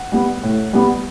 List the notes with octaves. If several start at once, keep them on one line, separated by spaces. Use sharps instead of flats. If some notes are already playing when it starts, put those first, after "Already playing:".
Already playing: F#5
G3 B3
A2
G3 B3